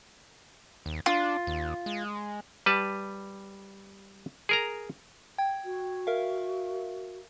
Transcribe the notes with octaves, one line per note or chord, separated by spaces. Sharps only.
D#2
D4 F4
D#2
G#3
G3 B4 A5
G#4 A#4 A#5
G5 G#6
F#4
A#4 E5 F5